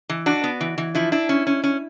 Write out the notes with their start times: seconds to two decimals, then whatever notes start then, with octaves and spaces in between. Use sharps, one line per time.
0.09 E3
0.26 D4 F#4
0.44 B3
0.61 E3
0.78 E3
0.95 F3 E4
1.12 D4 E4
1.29 C#4
1.47 C#4
1.64 C#4